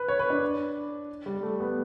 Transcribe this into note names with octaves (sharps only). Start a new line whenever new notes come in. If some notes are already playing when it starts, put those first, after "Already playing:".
Already playing: B4
C#5
B4
D4
G3
A3
B3